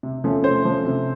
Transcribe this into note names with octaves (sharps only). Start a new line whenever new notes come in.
C3
F3 A3 C#4
C3 C5
F3 A3 C#4
C3